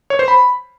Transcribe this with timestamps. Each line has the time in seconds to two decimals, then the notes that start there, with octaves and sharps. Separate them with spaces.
0.10 C#5
0.19 C5
0.28 B5